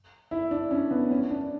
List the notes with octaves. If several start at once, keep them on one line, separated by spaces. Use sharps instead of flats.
E4
D4
C#4
B3
C#4
D4